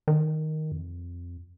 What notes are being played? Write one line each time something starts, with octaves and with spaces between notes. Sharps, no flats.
D#3
F2